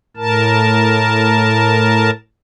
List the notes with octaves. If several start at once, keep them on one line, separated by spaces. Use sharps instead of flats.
A2 A#4 A5